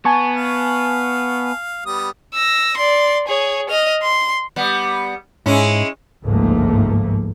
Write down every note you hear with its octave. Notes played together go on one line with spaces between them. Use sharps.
B3 G#5 A5 C#6
F5
G3 B3 D#6
E6 A#6
D5 C6
G#4 C#5
D#5 F6
C6
G3 B3
G#2 G#3 C#4 E4
G1 C#2 G#2 F3 A3 A#3